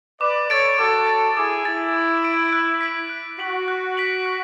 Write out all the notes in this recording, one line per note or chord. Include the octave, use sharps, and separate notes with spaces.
B4 D5 D6
A4 C#5 A6 D7
F#4 A4 D6
A6 D7
E4 G#4 D6
E4 A6 D7
D6
A6 D7
F#6
B6 D7 F#7
F#6
F#4 B6 D7 F#7
F#6
B6 D7 F#7
F#6